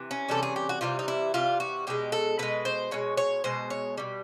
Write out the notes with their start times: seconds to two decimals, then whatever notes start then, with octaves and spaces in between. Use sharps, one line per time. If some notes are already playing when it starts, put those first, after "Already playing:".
Already playing: C3 E3
0.11 C#4
0.29 C3 E3 G3 A4
0.43 G#4
0.56 G4
0.69 F#4
0.81 C3 E3 G3 F4
0.99 D#4
1.08 E4
1.34 C3 E3 G3 F4
1.60 F#4
1.87 B2 G#3 G4
2.12 A4
2.39 B2 G#3 B4
2.65 C5
2.91 B2 G#3 C#5
3.17 C#5
3.44 B2 G#3 C5
3.70 C#5
3.97 B2 G3